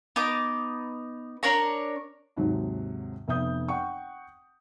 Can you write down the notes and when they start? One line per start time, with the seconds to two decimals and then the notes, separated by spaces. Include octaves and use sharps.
0.16 B3 D#4 D6
1.43 D4 A#4 C#5 A#5
2.36 D#2 G#2 C3 F#3
3.28 F1 B3 E5 D#6 G6
3.68 F#5 G5 C#6